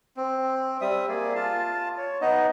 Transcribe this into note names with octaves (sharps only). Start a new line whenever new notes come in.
C4
G3 C4 E5 D#6
A#3 G#4 D5
F4 A5
C#5
B3 D#4 D#5